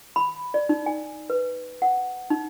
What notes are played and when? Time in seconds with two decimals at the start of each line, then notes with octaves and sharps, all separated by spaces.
0.16 B5
0.54 D5
0.69 D#4
0.86 G#5
1.30 B4
1.82 F#5
2.30 D#4